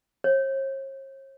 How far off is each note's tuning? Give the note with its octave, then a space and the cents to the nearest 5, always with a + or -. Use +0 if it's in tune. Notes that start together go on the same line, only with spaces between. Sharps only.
C#5 -45